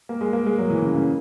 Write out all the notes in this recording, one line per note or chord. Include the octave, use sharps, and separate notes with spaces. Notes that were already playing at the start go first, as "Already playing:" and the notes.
A#3
G#3
A#3
G#3
F#3
E3
C#3
C#3